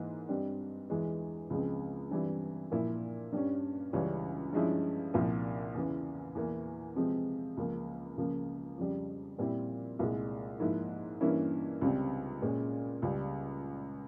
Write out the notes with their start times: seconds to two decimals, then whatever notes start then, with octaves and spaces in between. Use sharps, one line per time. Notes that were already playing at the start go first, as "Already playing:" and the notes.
Already playing: G#2 E3 A#3
0.29 G2 G3 C4
0.90 E2 E3 G#3
1.50 C#2 C#3 F3 G#3 C4
2.11 G2 E3 G3 C4 E4
2.71 A#2 F3 A#3 E4
3.32 G2 G3 C#4
3.93 C#2 C#3 E3 G3 C#4
4.53 G2 F3 G#3 C#4 E4
5.14 C2 A#2 F3
5.74 E2 C#3 E3
6.35 E2 E3 A#3
6.96 C3 F3 G#3 C4
7.57 C#2 C#3 F3 A#3
8.17 C#2 C#3 F3 A#3
8.78 F2 C#3 G3
9.39 A#2 G3 C4 E4
9.99 C2 A#2 G#3
10.60 G#2 F3 A#3 E4
11.21 G2 E3 A#3 C#4 E4
11.81 C#2 C3 G3 C4
12.42 A#2 G#3 C#4
13.02 C#2 C#3 G3